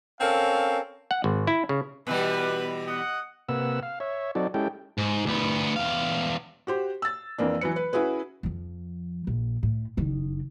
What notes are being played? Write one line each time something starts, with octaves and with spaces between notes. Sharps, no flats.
C4 C#4 A4 A#4 F5
F#5
G#1
E4
C#3
B2 E3 G3 B4
D#5 F#5
C3 A#3 B4 F#5 E6
F5
C#5 E5
F#3 C4 D#4 F#4 A4 D5
G#3 C#4 E4 G4 A4 G5
G#2
D2 B3
E2 F5
F#4 G4 C5
E6 A6
F2 E3 A#3 D4
E3 F#3 B4 C#7
B4
C#4 E4 F#4 G#4 B4
F2 F3
A#1
A2
F#1 D#3